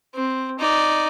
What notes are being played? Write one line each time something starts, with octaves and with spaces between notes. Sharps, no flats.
C4
D#4 D5